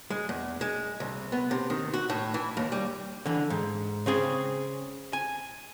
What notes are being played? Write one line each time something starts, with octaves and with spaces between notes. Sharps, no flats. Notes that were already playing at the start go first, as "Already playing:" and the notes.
G#3
E2
G#3
C2
B3
C3
D#3
F#4
A2
E3
D#2
G3
D3 E3
G#2
C#3 C4 G#4
G#5